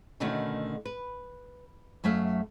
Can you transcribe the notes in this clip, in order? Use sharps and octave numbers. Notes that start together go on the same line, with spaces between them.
B2 D3 D#3 A3 C#4 F#4
B4
F#2 F#3 A3 E5 F5